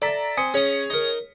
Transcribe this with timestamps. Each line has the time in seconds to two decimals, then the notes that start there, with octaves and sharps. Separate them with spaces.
0.02 A4 D5 E5 A#5 B6
0.37 C4 G#5 D#6 C#7
0.54 C#4 G#4 C#5 D#5
0.90 D#4 A#4